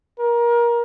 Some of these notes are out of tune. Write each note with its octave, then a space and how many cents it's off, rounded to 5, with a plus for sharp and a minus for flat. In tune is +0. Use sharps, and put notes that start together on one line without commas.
A#4 +25